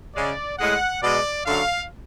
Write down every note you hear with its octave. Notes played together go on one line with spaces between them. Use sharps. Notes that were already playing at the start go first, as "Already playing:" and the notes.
C#3 G#3 D5
A2 G#3 F#5
B2 G#3 D5
F#2 D3 F#3 A3 F5